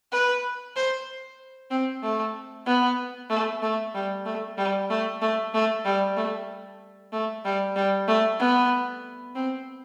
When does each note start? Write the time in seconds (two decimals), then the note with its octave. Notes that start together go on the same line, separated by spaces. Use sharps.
0.12 B4
0.76 C5
1.71 C4
2.02 A3
2.66 B3
3.30 A3
3.62 A3
3.94 G3
4.26 A3
4.58 G3
4.90 A3
5.21 A3
5.54 A3
5.85 G3
6.16 A3
7.13 A3
7.45 G3
7.76 G3
8.08 A3
8.39 B3
9.35 C4